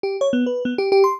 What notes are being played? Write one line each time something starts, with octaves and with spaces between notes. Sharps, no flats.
G4
C#5
B3
B4
B3
G4
G4
C6